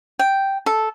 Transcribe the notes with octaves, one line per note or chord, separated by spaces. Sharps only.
G5
A4